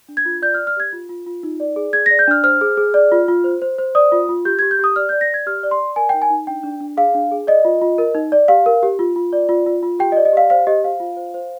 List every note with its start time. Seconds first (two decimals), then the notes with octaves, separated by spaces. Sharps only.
0.09 D4
0.17 G#6
0.25 F4
0.42 D5 G6
0.54 F6
0.59 D5
0.67 F6
0.77 G4 G#6
0.93 F4
1.09 F4
1.26 F4
1.43 D#4
1.60 D5
1.76 G#4
1.93 G#4 G#6
2.06 A#6
2.11 D5
2.19 G6
2.28 D4 F6
2.44 C5 F6
2.61 G#4
2.77 G#4
2.94 D5
3.12 F4
3.28 F4
3.44 C5
3.62 C5
3.78 C5
3.95 D5 D#6
4.12 F4
4.29 F4
4.45 G4 G6
4.59 G4 G#6
4.71 G6
4.79 G4 D#6
4.96 D5 F6
5.09 D5 G6
5.21 A#6
5.29 D5 G#6
5.46 G4 F6
5.63 D5
5.71 C6
5.80 D5
5.96 A#4 G#5
6.09 G5
6.14 D#4
6.22 G#5
6.30 D#4
6.47 D4 G5
6.64 D4
6.80 D4
6.97 G#4 F5
7.14 D4
7.32 G#4
7.47 D5 D#5
7.65 F4
7.82 F4
7.98 A#4
8.15 D#4
8.32 D5
8.48 G4 F5
8.66 A#4
8.83 G4
8.99 F4
9.16 F4
9.33 D5
9.49 F4
9.66 F4
9.83 F4
9.99 G4 G5
10.12 D#5
10.17 D5
10.25 D#5
10.33 G4 F5
10.50 C5 F5
10.67 G4 D#5
10.84 C5 F5
11.00 F4
11.17 C5
11.34 C5